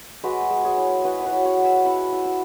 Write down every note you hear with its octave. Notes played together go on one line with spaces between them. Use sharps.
G#3 F#4 B4
G#3
G#4 C#5
E4
E4 F#4 B4
F#4 B4 C#5
E4
C#5 F#5
G#3
E5 G#5
E4 F#5 B5
E4
E5 G#5